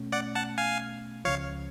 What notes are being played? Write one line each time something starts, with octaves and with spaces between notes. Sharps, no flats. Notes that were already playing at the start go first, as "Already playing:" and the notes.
Already playing: B2 A3 C#4
D5 F#5
F#5 A5
F5 G#5
C#2 C#3 F3 C#5 F5